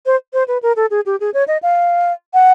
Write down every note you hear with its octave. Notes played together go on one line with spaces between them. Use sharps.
C5
C5
B4
A#4
A4
G#4
G4
G#4
C#5
D#5
F5
F#5